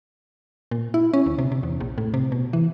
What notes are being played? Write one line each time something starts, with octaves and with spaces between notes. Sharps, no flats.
A#2
E4
C#4
D2
C3
C3
E2
A#1
A2
C3
B2
E3